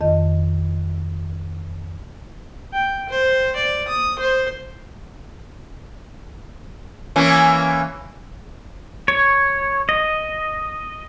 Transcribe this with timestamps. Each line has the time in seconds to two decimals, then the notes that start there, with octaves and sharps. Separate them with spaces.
0.01 F2 D#3 D#5
2.73 G5
3.09 C5
3.56 D5
3.88 D#6
4.19 C5
7.16 E3 A#3 C#4
9.08 C#5
9.89 D#5